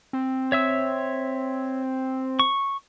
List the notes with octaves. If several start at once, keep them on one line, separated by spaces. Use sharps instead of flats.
C4
C#5 E5 E6
C#6